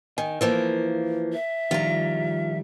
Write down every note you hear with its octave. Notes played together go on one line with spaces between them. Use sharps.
D#3 G#5
E3 F3 A#3 A#4
E5
D#3 F3 G3 F4 A#5